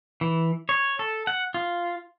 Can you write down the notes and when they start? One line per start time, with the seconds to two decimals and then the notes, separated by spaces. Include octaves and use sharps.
0.21 E3
0.69 C#5
0.99 A4
1.27 F#5
1.54 F4